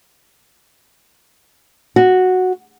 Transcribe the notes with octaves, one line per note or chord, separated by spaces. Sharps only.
F#4